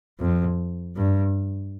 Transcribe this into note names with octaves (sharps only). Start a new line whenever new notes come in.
F2
G2